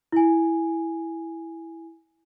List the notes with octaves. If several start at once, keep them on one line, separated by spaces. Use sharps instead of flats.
E4 G#5